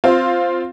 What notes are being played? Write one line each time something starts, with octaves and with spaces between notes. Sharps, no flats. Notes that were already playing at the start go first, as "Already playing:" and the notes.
C4 F4